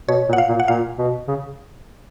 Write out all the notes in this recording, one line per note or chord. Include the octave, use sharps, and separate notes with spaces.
B2 C#5
A#2
F#5
F5
A#2
F#5
A#2 F5
B2
C#3